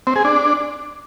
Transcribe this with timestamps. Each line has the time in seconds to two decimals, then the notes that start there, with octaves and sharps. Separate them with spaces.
0.07 C4
0.16 G#4
0.25 D4